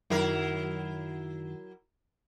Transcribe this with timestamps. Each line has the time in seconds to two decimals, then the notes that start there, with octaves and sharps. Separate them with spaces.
0.10 F#2 D#3 F#3 E4 A#4